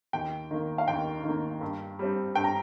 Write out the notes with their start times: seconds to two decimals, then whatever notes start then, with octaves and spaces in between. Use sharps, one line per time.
0.13 D#2 G5
0.51 D#3 A#3
0.78 F5
0.88 D#2 G5
1.24 D#3 A#3
1.61 G2
1.99 G3 C4
2.35 G2 G5
2.44 A#5